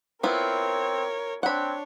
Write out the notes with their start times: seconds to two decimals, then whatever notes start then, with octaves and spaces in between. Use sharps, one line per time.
0.23 B3 C4 E4 F4 A#4 C#5
1.43 C4 D4 C#5 F#5 B5